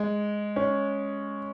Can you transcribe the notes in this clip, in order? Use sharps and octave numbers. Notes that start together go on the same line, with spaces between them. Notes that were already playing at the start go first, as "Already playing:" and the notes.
Already playing: G#3
C#4